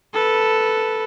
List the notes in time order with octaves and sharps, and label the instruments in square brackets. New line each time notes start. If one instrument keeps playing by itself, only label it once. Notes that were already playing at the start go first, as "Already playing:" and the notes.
[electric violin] A4 B4